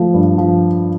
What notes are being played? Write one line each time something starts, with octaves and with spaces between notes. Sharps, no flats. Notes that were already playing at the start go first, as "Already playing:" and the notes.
Already playing: F3 A3
G2
F3